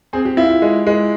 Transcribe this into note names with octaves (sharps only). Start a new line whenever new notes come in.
C4 G#4
G4
E4 F4
F4
G#3
G#3 E4